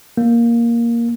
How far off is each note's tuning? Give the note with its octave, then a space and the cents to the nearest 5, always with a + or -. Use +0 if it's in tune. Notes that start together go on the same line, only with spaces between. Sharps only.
A#3 +5